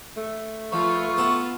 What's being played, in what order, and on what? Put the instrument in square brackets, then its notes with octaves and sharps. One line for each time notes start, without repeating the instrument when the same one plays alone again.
[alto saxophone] A3
[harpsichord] F3 [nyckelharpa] F4 B4 [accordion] C#6
[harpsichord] B3 A4